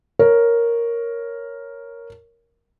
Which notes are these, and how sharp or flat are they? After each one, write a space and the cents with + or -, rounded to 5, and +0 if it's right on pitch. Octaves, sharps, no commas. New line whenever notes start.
A#4 +0 C#5 +0